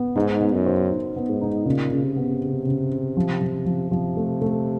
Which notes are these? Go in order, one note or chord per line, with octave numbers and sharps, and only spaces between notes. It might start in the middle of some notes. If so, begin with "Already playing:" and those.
Already playing: B3
G#2 D#4
B3
F#2
C5
D#4
B3
G#2
D#4
A#2 C#3
C#3
C3
B3
C#3
C#3
C#3
F3
F3
F3
C3 F3
A3
A3